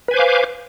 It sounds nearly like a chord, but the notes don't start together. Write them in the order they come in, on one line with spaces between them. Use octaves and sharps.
B4 G#5 C5 D6 F5